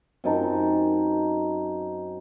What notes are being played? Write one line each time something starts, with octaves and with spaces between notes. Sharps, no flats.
F#2 C4 D#4 A5